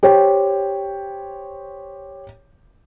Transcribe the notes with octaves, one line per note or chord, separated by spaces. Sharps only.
G4 C5 C#5 G5